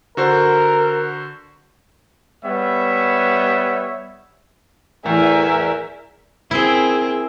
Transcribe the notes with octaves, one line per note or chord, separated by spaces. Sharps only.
D3 F#4 A#4 C5
G3 B3 C#5 E5
E2 A2 A#4 E5 G#5
C4 E4 G#4 A#4